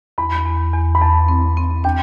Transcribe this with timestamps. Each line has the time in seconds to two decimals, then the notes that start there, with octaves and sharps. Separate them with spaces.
0.18 E2 B5
0.46 E2
0.73 E2
0.95 B5
1.02 E2 A5
1.28 C4
1.57 C4
1.84 D4 G5